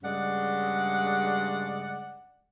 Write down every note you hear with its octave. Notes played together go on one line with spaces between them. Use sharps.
G2 C#3 G#3 D5 F#5